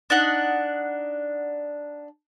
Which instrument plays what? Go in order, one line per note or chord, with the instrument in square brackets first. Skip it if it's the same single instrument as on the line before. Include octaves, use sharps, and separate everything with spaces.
[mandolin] D4 D#4 F#5